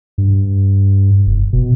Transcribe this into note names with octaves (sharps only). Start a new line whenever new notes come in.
G2
F1
B2